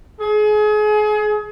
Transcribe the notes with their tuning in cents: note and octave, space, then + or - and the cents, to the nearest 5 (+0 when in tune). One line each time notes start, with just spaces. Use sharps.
G#4 +30